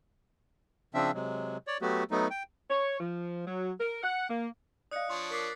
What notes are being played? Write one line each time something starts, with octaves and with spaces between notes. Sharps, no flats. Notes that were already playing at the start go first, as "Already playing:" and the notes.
C#3 F3 C4 D4 E5
C3 F#3 G#3
C#5 D5
F#3 A3 B3 F#4 G4
F#3 A3 B3 D#4
G5
C#5
F3
F#3
A#4
F#5
A#3
D5 D#5 F5 D#6 F#6 C#7
F3 D4 C#5 C6
A#4 D6 A6 B6 C7